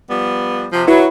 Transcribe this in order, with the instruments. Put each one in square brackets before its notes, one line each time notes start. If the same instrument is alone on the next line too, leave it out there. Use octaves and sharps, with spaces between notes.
[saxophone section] F3 G3 B3
C3 F3
[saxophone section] F#3 [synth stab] E4 B4